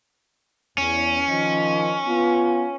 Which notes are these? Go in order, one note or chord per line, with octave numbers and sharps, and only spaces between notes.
E2 C#4
D#3 F3 D#5
B3 F4